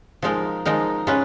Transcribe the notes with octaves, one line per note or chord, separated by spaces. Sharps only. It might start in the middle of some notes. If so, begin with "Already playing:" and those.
F3 G#3 D#4 A#4
F3 G#3 D#4 A#4
G#3 C#4 F4 B4